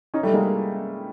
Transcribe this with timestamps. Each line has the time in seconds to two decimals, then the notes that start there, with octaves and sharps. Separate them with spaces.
0.14 C#4 D#4
0.23 G3 A3
0.34 G#3 A#3